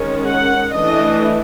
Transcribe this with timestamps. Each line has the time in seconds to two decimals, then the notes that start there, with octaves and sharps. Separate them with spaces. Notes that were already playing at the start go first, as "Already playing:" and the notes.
Already playing: D#3 G#3 C#4
0.26 F#5
0.74 E3 A3 D4 D#5